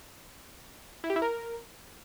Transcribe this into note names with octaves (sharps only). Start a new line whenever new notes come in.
E4
G4
E4
A#4